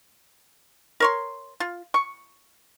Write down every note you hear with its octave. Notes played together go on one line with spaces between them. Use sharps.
A#4 C#5 C6
F4
C#6